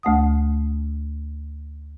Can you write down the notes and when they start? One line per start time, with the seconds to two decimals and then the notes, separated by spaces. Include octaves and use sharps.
0.03 D2 A3 F#5 D#6